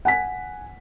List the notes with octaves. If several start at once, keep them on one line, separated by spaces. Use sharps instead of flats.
F#5 G#5 B6